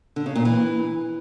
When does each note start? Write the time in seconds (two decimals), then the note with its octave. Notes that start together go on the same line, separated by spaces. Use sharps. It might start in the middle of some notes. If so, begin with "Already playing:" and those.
0.16 D3
0.26 C#3
0.35 A#2
0.45 E3